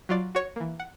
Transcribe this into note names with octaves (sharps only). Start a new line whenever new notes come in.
F#3 F4 D5
F#4 C#5
E3 A#3
F#5